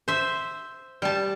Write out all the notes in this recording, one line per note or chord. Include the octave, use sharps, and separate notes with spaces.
C5 E5
G3 A5